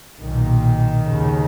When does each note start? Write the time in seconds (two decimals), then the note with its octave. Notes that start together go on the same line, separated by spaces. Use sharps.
0.21 B1 A#2 D#3
1.04 D#2 C#3